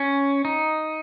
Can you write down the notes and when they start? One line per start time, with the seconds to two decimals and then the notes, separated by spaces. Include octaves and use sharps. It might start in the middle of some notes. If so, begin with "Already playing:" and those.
Already playing: C#4
0.45 D#4